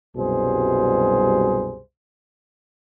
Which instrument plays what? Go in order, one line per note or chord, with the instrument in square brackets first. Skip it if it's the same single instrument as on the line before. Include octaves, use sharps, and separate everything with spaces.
[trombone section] C2 F#2 B2 G3 G#4 C5